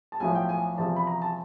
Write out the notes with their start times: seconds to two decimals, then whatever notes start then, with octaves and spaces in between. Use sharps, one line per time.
0.12 A5
0.20 B1 A2 F3 G#5
0.35 G5
0.49 G#5
0.78 E2 C3 F3 A5
0.96 B5
1.07 A#5
1.22 A5